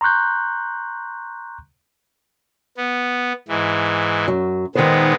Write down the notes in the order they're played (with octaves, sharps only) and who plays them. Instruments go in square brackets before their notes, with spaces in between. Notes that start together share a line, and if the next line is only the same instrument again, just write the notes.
[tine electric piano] A#5 C6 C#6 F#6 G6
[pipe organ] B3
G#2 E3
[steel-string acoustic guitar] F#2 F#3
[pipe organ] A#2 G#3 B3 [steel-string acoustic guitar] D#3 C5